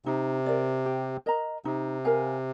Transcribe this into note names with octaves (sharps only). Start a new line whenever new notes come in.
C3 D#4
A#4 D5
G4
A#4 D#5 A#5
C3 D#4
A#4 F5 G#5